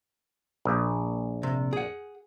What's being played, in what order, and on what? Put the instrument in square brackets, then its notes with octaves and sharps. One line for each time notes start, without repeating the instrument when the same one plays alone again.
[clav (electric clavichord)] A#1
[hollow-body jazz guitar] C3
G#4 F#5